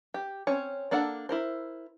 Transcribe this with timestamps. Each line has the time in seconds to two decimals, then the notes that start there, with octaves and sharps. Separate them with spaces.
0.14 G4
0.47 C4 C#4 C#5
0.91 A#3 D4 A4 D5 F#5
1.29 E4 A#4 C5